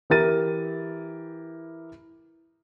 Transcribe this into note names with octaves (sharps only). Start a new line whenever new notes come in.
E3 E4 G4 A#4 A6 D#7